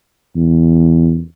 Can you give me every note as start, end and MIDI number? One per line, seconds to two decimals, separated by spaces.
0.36 1.20 40